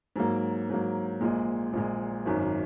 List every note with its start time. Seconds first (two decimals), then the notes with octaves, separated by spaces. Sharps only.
0.16 G#2 F#3 A#3
0.69 G#2 F#3 A#3
1.21 A#1 A#2 G#3
1.73 A#1 A#2 G#3
2.25 G#1 F#2 D#3